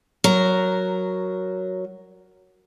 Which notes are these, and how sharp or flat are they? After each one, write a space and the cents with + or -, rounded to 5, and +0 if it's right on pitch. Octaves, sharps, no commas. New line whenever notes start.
F#3 +0 A#4 +0 A#5 +0